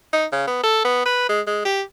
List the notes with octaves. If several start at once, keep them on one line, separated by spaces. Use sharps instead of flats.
D#4
C#3
B3
A4
B3
B4
G#3
G#3
G4